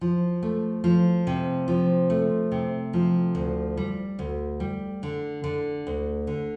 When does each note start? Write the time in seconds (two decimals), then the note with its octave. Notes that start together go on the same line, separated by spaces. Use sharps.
0.01 F3
0.43 A3
0.84 F3
1.27 C3
1.68 F3
2.10 A3
2.52 C3
2.93 F3
3.35 D2
3.77 G3
4.19 D2
4.60 G3
5.03 D3
5.44 D3
5.87 D2
6.27 D3